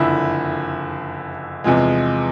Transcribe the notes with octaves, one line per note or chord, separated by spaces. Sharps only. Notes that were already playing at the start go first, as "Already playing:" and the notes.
Already playing: F#1 F2 D3 E4
E2 C3 F3 G#3